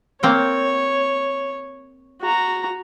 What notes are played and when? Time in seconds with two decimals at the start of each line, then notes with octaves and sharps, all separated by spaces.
0.23 A#3 C4 C#5 G5
2.22 F#4 A#5